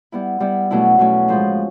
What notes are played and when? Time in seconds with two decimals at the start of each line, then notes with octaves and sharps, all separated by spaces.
0.12 G3 B3 E4
0.40 G3 B3 E4
0.71 B2 F#3 A3 C#4 E4
0.98 B2 F#3 A3 C#4 E4
1.28 A2 F3 G#3